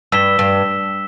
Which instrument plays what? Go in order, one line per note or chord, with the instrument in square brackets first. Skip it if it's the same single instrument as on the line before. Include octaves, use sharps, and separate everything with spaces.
[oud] G2 [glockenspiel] E6 B6 E7 G7
[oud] G2